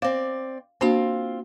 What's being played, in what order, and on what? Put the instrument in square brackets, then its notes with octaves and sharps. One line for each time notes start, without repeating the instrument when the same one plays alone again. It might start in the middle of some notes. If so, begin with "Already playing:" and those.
[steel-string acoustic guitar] C4 D5 [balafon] F5
[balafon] A#3 D4 F#4 [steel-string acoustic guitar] C4 F4